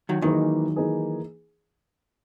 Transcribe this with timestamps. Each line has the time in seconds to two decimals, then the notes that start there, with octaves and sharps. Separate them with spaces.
0.09 D#3 F#3
0.22 D#3 E3 F#3 A#3 D#4 G#4 B4
0.76 E3 A#3 D#4 G#4 B4